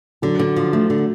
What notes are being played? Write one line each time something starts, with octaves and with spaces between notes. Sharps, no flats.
D3 F#3
D3
F3
A3
D3